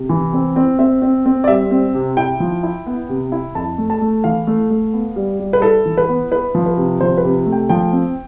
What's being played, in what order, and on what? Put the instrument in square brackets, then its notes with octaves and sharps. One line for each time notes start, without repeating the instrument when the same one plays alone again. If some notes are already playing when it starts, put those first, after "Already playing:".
Already playing: [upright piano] C3
E3
C4
C4
[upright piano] C4 [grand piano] E5
[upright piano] C4
C4
[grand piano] D5
[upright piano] G3 [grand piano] E5
[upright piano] C4
C3
[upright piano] E4 [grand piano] G5
[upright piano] F3
E4
B3
C3
E4
[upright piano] F2 [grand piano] A5
[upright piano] A3
[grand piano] A5
[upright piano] A3
[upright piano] E3 [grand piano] F5
[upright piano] A3
A3
B3
G3
G3
[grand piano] B4
[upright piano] E4 [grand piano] A4
[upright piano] E3
[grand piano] B4
[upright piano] B3
[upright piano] E4 [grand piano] B4
[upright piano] F3
[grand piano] B4
[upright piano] C3
[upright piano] F3 [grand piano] C5
[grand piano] B4
[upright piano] C3
A3
[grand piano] G5
[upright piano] F3 [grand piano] G5
[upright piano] C4